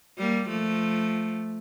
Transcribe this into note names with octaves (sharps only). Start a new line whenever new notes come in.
G3 A#3
F3 A3